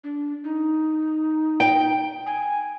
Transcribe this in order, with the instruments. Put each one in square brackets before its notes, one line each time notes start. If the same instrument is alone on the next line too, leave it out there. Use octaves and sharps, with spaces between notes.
[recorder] D4
D#4
[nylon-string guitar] G5
[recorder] G#5